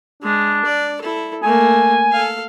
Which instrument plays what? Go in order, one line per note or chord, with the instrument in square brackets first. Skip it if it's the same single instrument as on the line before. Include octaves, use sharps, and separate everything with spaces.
[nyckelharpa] G#3 [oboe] D4
[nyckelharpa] D5
E4 A4
[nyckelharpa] A3 A#3 [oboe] G#5
[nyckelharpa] A4 F5